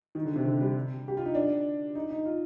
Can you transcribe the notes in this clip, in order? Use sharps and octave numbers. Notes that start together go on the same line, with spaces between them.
D#3
D3
C3
D3
G3
G4
F4
D#4
D4
D#4
D#4
F4